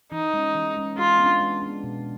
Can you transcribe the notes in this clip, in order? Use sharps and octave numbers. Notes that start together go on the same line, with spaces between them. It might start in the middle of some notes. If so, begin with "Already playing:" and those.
E3 D#4
G#3 C#4
E3
G#3 C#4
G#3 F4
B3
D4
G#3
B3 D4
B2